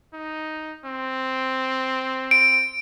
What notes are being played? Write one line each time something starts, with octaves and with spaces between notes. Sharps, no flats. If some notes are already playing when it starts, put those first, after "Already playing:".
D#4
C4
D7